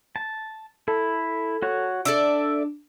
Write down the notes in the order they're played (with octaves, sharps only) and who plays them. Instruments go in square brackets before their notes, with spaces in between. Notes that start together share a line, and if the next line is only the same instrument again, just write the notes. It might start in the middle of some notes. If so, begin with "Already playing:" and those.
[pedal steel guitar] A5
[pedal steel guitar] E4 [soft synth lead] A4
[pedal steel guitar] F#4 C#5
[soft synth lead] D4 [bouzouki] A4 D5 E5 [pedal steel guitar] D6